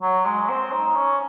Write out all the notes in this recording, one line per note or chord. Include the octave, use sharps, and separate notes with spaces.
F#3
G#3
C4
D#4
C#4